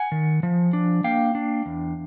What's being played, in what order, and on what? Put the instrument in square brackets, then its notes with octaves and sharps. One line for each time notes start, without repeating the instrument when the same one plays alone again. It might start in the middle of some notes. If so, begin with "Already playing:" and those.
Already playing: [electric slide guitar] F#5 G#5
D#3
F3
D4
A#3 F5 G5
D4
E2